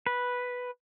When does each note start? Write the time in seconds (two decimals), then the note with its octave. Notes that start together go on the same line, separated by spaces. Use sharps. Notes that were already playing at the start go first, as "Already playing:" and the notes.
0.06 B4